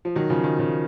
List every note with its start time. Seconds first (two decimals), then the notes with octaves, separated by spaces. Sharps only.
0.05 F3
0.16 D#3 F#3
0.30 C#3 F3
0.44 D#3 F#3
0.59 C#3 F3